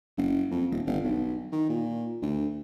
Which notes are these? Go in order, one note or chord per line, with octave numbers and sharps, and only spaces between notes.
F#1
F2
D#1
G1
B1
D#3
A#2
D2